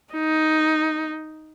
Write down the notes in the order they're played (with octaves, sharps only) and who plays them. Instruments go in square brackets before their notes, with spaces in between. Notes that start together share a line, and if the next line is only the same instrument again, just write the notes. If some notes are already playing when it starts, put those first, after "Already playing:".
[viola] D#4